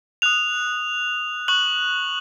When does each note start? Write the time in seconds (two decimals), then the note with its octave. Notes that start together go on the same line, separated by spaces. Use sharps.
0.22 D#6 F#6 F7
1.48 C#6 F#6 F#7